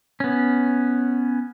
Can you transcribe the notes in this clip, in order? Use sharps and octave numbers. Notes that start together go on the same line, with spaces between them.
B3 C#4